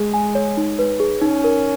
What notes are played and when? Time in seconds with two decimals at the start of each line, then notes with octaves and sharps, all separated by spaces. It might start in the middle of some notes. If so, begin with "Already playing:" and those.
Already playing: G#3 G#4
0.14 G#5
0.35 C#5
0.57 D#4
0.79 B4
1.00 G#4
1.22 C#4 D#4
1.44 A#4